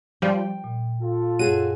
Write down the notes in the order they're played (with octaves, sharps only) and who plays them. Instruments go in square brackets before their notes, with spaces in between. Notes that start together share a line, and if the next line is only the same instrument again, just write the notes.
[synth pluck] F3 G3 [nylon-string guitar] G5
[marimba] A#2
[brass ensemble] F4 A4
[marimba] F#2 C#5 [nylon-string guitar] F#4 G#4 [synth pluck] D#7